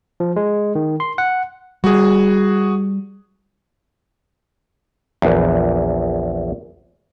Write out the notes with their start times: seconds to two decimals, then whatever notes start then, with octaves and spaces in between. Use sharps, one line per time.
0.20 F3
0.36 G#3
0.75 D#3
1.00 C6
1.18 F#5
1.84 G3 F#4 G#4
5.22 A#1 E2